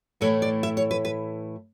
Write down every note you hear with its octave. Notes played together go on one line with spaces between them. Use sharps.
A2 E3 A3 E4 C#5
D5
E5
C#5
B4
B4